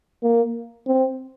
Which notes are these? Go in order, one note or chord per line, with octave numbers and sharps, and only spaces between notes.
A#3
C4